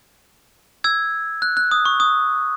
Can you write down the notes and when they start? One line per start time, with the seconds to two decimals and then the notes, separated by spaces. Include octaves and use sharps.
0.84 E6 G#6
1.42 F#6
1.57 F#6
1.71 D#6
1.85 C#6
2.00 D#6